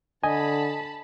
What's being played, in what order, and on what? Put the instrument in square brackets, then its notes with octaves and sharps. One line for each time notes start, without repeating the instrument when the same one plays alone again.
[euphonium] D3 [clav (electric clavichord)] D#5 [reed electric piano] G#5 [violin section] A5 B5